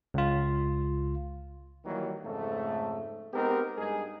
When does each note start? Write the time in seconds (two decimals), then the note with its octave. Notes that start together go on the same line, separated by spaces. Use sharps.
0.14 C#2 F4
1.85 D#3 E3 F#3 G3 A#3
2.23 F2 G#2 C#3 A3
3.33 G#3 B3 C4 D#4 G4 A#4
3.77 G2 G#3 D#4 G#4